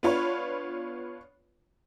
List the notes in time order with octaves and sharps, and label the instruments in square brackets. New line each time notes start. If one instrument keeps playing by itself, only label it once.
[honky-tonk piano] B3 D4 F4 C#5 B5